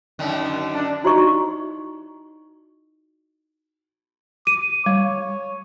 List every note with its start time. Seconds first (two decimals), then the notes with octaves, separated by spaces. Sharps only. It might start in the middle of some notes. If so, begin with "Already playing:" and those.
0.19 F#2 D3 D#3
0.74 D4
1.04 D#4 E4 F#4 D5 D#5 C#6
4.47 D6 D#7
4.86 G3 C#5